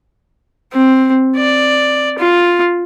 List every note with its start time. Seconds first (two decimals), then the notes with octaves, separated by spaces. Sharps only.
0.73 C4
1.36 D5
2.19 F4